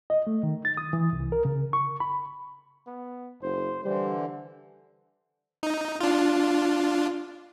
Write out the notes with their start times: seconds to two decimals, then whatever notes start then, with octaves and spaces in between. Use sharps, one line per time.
0.10 D#5
0.27 A3
0.43 D#3
0.65 A6
0.77 D#6
0.93 E3
1.13 C2
1.32 A#4
1.45 C#3
1.73 C#6
2.00 B5
2.87 B3
3.42 F#1 C5
3.84 D3 E3 G3 C5
5.63 D#4
6.01 D4 F4